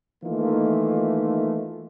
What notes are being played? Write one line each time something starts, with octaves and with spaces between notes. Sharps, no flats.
D#3 E3 A3 A#3 D#4 F4